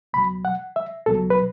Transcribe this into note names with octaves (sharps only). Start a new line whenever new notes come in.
C#2 B2 F#3 B5
F#5
E5
C#2 B2 F#3 A4
B4